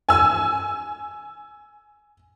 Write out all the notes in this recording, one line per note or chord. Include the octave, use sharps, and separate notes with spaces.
G#5 E6